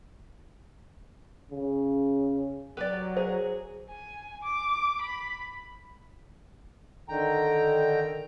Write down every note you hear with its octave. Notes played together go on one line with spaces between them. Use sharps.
C#3
F#3 G4 B4 D5
G#4 C5
G#5
D6
B5
D3 D#3 G5 A#5